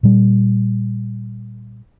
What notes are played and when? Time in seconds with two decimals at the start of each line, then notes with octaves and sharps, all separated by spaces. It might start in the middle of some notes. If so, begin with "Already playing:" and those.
0.03 A#2 G3